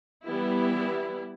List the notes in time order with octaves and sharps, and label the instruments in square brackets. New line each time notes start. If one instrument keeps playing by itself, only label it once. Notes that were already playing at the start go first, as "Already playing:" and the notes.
[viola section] E3 G3 B3 E4